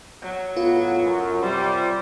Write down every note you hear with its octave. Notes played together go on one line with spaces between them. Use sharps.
F#3
A2 B3 F4
F#2
C3 G3 C5